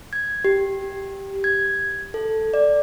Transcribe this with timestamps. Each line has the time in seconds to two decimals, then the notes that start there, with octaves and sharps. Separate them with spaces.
0.13 G#6
0.45 G4
1.44 G#6
2.14 A4
2.54 D5